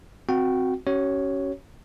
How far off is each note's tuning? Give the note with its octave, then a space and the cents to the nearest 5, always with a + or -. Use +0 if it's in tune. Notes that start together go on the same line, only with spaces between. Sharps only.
C4 +0 F#4 -10 G5 -20
C#4 +0 F#4 +45 C#5 +0